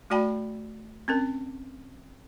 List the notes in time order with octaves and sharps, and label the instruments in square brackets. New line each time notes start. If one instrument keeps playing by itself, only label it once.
[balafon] A3 F#4 D5 G5 A5 B5
C4 C#4 A#4